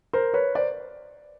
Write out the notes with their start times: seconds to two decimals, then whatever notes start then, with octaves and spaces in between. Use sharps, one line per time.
0.13 A#4 C5
0.34 B4 C#5
0.55 C5 D5